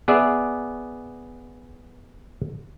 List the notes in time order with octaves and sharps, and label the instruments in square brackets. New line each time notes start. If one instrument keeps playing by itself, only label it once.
[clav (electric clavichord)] B3 G#4 D5 E5